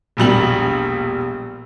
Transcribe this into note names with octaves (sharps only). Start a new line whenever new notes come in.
E1 A#1 G3 F#7